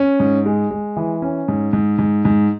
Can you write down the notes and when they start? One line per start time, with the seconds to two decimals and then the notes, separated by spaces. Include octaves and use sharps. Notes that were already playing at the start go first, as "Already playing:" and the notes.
Already playing: C#4
0.20 G#2
0.46 G#3
0.71 G#3
0.96 E3
1.22 C#4
1.48 G#2
1.73 G#2
1.98 G#2
2.25 G#2